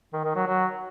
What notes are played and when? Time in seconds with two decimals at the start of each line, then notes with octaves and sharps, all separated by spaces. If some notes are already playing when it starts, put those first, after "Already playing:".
0.13 D#3
0.24 D#3
0.36 F#3
0.47 F#3